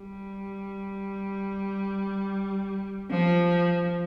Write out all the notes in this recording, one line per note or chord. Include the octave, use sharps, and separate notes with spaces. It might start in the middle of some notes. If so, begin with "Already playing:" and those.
Already playing: G3
F3